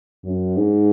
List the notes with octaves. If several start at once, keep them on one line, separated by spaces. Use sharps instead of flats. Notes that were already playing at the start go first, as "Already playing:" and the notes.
F#2
G#2